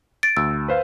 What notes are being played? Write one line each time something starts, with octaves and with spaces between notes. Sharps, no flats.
A6 D7
D2 E6
B4 C5 F5